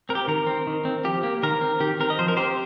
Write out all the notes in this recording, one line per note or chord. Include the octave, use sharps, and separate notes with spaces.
C4 A#4
G4
D#3 A#4
C4
D#3
C4
F3 G4
A#3
D#3 A#4
C4
D#3 G4
C4 A#4
D#5
F3 C5
A#4
C4 G4 C5